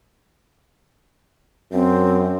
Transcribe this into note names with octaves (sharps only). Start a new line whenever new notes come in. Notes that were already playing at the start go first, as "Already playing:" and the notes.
F#2 C4